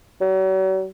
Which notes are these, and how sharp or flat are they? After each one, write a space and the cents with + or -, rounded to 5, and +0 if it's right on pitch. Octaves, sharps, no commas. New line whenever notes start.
F#3 +40